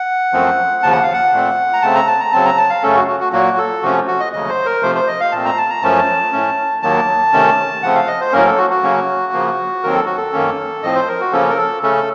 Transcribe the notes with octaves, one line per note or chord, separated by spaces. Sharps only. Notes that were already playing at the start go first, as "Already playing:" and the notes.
Already playing: F#5
F#2 F3 A3 C4
D#2 C#3 F3 A5
F#5
F5
F#5
A#2 A3 C4
A#5
C#3 A3 C4 A5
A#5
A5
A#5
C#3 F#3 C4 A5
A#5
A5
F5
F#2 C#3 A3 C#4 A4
F#4
F#4
F#4
A#2 F#3 A#3 F#4
A4
C3 F3 A3 C#4 F#4
F#4
D#5
D#2 C#3 F#3 A3 D#5
C5
A#4
C3 F3 A3 C5
C5
D#5
F5
A#2 A3 C4 A5
A#5
A5
A#5
F#2 F3 A3 C#4 A5
A2 A3 C#4
D#2 D#3 F#3 A#3 A5
C3 D#3 A3 C#4
C#3 F3 A3 C4 F#5
F5
D#5
C5
A2 F#3 A#3 C#4 A#4
A4
F#4
F#4
C#3 F#3 A#3 C#4
C#3 F3 A#3
D#2 D#3 F#3 C4 A#4
A4
F#4
A4
F#2 D#3 A#3 C#4
A2 F3 C4 D#5
C5
A#4
F#4
C#3 F3 A#3 C#4 A4
A#4
A4
C#3 A3 C#4 A4